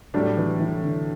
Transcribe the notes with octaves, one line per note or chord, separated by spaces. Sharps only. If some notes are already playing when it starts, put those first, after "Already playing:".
A2 F#3 G3 D4
E3
E3
D3